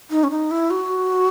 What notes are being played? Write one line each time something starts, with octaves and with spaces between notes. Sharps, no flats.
D#4
C#4
D#4
E4
F#4